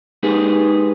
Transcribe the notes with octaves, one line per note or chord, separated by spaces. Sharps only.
G#3 D#4 G4 G#4 B4 C5